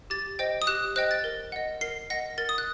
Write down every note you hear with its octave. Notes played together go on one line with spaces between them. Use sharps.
G4 A6
C5 D#5 G5
D#6
G4 F#6
C5 D#5 G5 F#6
A6
A#4
D#5 F#5
A#4 C7
D#5 F#5 A#6
A#4 A6
D#6
F#6